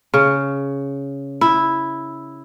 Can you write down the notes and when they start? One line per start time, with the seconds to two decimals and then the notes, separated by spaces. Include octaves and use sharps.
0.14 C#3
1.41 E4